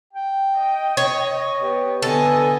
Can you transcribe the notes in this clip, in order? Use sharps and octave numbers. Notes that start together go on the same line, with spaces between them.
G5
D#5
C#5
B3 G4
D3 B3 A4 D#5 G#5